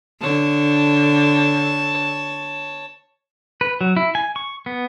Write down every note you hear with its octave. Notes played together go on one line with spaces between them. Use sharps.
D3 C#5 A5
B4
F#3
E4
G#5
C#6
B3